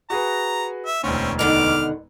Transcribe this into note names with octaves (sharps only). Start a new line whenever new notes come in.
F#4 G#4 B4 A#5
E5
E1 D2 C4 C#4
B2 D3 D#3 D6 F6